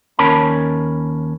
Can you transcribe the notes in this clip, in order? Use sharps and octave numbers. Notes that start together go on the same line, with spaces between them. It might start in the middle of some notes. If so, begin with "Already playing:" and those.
D#2 C#4 A#4 C#5 A5 B5